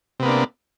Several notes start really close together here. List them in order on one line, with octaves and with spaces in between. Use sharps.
C3 B3 A#3 D4